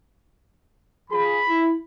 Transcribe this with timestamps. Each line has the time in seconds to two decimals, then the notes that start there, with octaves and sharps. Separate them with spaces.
1.11 F3 G#4 B5
1.48 E4